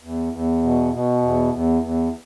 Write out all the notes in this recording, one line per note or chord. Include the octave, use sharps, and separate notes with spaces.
E2
E2
B2
B2
E2
E2
E2